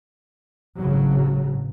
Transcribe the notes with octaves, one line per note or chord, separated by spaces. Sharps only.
G#1 A2 C#3 F#3